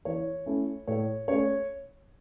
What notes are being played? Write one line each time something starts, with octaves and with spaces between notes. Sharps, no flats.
E3 C#5
A3 C#4 E4
A2 C#5
A3 C#4 C#5